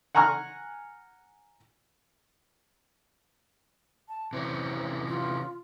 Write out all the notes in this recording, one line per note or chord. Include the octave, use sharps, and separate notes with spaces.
F#5 G#5 A#5 C#6 F6
A5
C3 E3 C#4 C5
F4